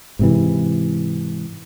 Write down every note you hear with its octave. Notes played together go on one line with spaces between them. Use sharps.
G#2 C3 E3